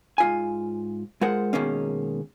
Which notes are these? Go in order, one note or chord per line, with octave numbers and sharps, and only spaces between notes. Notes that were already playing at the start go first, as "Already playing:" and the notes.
G#2 F4 G#5
G#3 F4 A#4 C5 F#5
B2 D#3 G#3 A#3 C#4